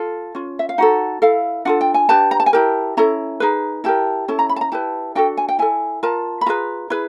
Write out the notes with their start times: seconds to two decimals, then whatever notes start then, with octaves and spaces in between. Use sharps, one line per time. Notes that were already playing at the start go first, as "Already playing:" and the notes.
Already playing: F4 A4
0.35 C#4 F4
0.59 E5
0.69 F5
0.78 D#4 F#4 A4 F#5
1.22 E4 A4 F5
1.65 D4 F4 A4 F#5
1.81 G5
1.94 G#5
2.09 D4 G4 B4 A5
2.31 A#5
2.40 A5
2.46 G#5
2.53 E4 G4 A#4 A5
2.97 C#4 E4 A4 A#5
3.40 D#4 G#4 B4
3.84 E4 G4 A#4 A5
4.28 C#4 E4 A4 A5
4.39 A#5
4.49 B5
4.56 A5
4.61 A#5
4.72 E4 G4 B4 A5
5.15 D4 F#4 A4 G5
5.37 G#5
5.49 G5
5.59 E4 A4 G#5
6.03 F4 A#4 A5
6.41 B5
6.46 F4 G#4 B4 A#5
6.90 E4 G#4 B4